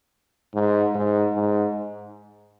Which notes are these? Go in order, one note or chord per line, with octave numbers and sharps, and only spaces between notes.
G#2
G#2
G#2